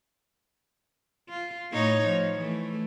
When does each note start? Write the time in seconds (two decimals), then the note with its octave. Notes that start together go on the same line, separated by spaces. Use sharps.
1.29 F4
1.71 A2 D#4 C#5
2.06 F3
2.39 E3 A3